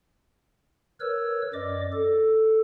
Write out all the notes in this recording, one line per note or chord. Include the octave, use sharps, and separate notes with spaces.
A#4 B4 C#5 E6
F#2 D5 D#5 D6
A4